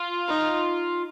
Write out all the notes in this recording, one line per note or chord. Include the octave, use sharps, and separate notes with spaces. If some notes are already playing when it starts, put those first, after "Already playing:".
Already playing: F4
D#4